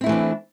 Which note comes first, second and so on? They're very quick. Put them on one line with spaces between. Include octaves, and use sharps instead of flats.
C4 E4 A3 E3 D4